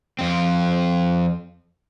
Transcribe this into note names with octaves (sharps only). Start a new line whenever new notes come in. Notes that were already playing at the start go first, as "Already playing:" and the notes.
F2 C4